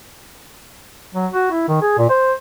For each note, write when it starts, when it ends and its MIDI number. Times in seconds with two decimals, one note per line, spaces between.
1.15 1.27 54
1.32 1.47 66
1.51 1.67 64
1.68 1.79 51
1.82 1.95 68
1.98 2.08 46
2.09 2.34 72